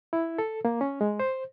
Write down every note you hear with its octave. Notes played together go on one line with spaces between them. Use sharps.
E4
A4
A#3
C#4
G#3
C5